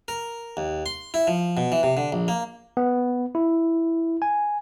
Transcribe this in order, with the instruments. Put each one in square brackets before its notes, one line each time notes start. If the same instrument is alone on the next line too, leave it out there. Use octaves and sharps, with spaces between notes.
[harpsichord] A#4
D#2
C6
E4
F3
B2
E3
C3
D3
A#1
A#3
[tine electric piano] B3
E4
G#5